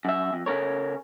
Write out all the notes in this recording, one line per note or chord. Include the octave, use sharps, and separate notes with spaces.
F#2 E5
F2
C#3 C#4 A4 A#4 C#5